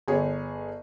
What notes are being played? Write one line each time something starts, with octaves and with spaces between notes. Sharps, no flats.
G1 G#4 C#5